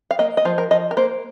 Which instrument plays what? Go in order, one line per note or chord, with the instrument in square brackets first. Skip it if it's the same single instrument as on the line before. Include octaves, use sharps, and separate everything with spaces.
[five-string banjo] F5
A#3 D#5
D#5
F3 C5
A#4
F3 D#5
A#4
A#3 C5